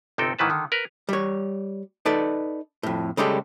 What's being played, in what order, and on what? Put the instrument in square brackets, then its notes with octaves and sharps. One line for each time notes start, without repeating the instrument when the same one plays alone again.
[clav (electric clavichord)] G1 C3 C4 D#4 A4 G5
G#2 D#3 E3 B4 A5
D3 D#3
A#4 B4
[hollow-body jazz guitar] G3 C#5
D#4 A4 B4 D5
F2 A2
C#3 G3 G#3 G4 A4